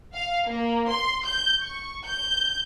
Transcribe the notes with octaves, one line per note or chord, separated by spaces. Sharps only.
F5
A#3
C6
G6
C#6
G6